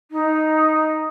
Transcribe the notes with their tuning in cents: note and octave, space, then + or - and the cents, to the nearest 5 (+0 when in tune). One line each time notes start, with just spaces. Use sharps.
D#4 +0